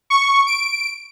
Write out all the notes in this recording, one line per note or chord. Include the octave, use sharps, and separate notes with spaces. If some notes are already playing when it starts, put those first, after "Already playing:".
C#6
D7